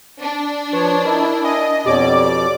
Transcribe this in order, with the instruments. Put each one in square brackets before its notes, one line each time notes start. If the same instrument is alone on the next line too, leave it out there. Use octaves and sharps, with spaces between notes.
[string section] D4
[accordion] F3 C#5 [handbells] B4
[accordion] E4 [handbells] A#4 D#5
[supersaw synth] D#5 [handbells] G#5
[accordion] F2 B2 [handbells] G4 C#5 [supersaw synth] D5 D6